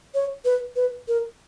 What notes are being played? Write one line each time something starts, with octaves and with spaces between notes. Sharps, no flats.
C#5
B4
B4
A#4